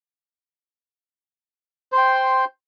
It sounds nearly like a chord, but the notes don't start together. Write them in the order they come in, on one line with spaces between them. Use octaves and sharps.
C5 C6 G5